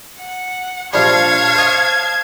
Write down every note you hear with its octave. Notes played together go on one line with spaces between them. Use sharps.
F#5
A#1 F3 G3 C#5 F5 A5 G#6
C5 D#5